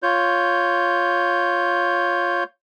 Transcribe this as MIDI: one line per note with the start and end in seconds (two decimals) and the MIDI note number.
0.03 2.44 65
0.03 2.44 73
0.03 2.44 91